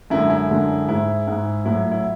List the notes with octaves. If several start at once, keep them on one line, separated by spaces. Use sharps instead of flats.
F#2 D3 G#3 E4
E4
F#2 D3 G#3
G#2 G#3 E4
G#2 G#3
A2 F#3 E4
E4